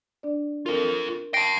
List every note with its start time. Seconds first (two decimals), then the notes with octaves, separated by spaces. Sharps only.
0.23 D4 D5
0.66 F4 A4 A#4
1.34 G5 A5 A#6 C7 D7